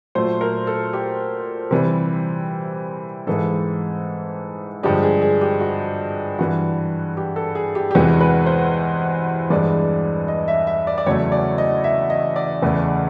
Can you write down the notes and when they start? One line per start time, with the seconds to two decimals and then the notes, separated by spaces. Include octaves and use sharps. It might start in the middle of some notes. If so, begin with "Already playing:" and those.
0.15 A#2 F#3 A3 C5
0.41 A#4
0.67 A4
0.93 G4
1.71 C3 E3 G3
3.27 G#2 E3 G#3 A4
4.83 G2 D3 F3 G#3 G4
5.03 G#4
5.22 G#4
5.41 G4
5.60 F#4
6.39 G2 E3 G3 F#4
7.17 G4
7.36 A4
7.55 G#4
7.75 G4
7.91 G4
7.95 E2 C3 E3 G#3 F#4
8.20 B4
8.46 C5
9.50 G2 E3 G#3 D5
10.28 D#5
10.48 E5
10.67 E5
10.87 D5
10.98 D5
11.06 E2 C#3 F#3 A3 C#5
11.32 D5
11.58 D#5
11.84 E5
12.10 D#5
12.36 D5
12.62 E2 C#3 E3 A3